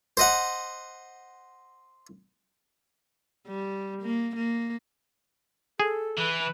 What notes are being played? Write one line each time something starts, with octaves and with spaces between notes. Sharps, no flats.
C5 D#5 F#5
G3
A#3
A#3
G#4 A4
E3 B4